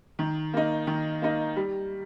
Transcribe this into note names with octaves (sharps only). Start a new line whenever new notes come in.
D#3
A#3 D#4
D#3
A#3 D#4
G3